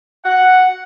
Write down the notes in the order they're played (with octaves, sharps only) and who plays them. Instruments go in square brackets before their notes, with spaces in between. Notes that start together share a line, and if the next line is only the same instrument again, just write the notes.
[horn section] F#5